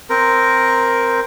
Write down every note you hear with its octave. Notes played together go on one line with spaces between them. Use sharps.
C4 A#4